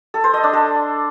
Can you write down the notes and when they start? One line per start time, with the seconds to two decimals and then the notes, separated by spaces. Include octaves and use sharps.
0.14 A4
0.24 C5
0.34 D#5
0.43 D4
0.53 A4